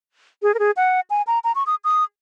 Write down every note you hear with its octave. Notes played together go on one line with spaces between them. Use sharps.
G#4
A#4
G#4
F#5
G#5
A#5
A#5
C#6
D#6
D#6